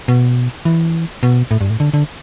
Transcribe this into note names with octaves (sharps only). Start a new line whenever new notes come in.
B2
E3
B2
A2
G2
A2
D3
D3